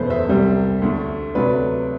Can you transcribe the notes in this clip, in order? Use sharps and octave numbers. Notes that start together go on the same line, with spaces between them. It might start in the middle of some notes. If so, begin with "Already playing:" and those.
Already playing: F#1 E2 B2 A3 B4 C5
C5 E5
C2 C3 G3
D2 D3 A3
D2 C3 F#3 B4 D5